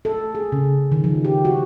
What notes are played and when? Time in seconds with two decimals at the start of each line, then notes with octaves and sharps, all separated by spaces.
0.05 A4
0.35 G#4
0.52 C#3
0.92 D#3
1.04 F3
1.25 G4
1.45 F#4